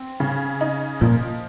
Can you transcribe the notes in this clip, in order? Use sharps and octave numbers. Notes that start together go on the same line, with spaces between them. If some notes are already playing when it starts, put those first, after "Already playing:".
Already playing: C4
C#3
D#4
A#2 F3